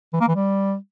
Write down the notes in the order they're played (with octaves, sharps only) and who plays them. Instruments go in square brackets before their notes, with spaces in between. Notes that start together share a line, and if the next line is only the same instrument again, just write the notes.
[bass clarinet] E3
A#3
E3
G3